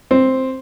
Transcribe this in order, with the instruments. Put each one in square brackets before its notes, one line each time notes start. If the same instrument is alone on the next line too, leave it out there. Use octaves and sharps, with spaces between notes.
[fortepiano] C4